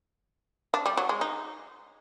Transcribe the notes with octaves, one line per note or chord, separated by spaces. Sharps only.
D4
G3
F#3
G#3
D#4